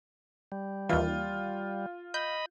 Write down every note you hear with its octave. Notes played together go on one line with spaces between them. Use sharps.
G3
D#2 E3 F4
D#5 B5 G6